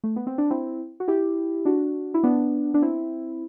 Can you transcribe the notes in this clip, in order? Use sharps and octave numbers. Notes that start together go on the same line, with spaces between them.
A3
B3
C4
D4
C4 E4
F#4
E4 G4
D4 F#4
E4
B3 D4
D4
C4 E4